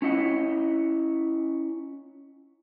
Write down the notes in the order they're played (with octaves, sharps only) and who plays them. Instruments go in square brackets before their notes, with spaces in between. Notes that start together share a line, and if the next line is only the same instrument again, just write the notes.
[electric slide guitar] C#4 E4 D#5 F#5